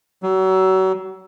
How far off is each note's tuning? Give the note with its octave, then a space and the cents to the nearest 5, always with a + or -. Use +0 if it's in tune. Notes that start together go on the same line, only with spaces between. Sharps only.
F#3 +35